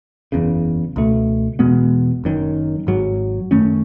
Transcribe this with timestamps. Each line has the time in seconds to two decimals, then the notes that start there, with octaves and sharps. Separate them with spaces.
0.32 F#1 E2 C#3
0.96 C#2 B2 A3
1.59 E2 B2 G#3 B3
2.24 F#1 F#2 D#3
2.87 G#1 G#2 F#3
3.51 F#2 D#3 A3 C#4